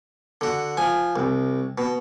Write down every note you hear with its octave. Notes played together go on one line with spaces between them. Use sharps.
D3 F#4
F3 G#5
C2
B2